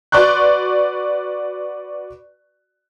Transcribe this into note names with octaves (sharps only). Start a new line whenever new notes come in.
F#4 B4 D5 C6 C#6 F#6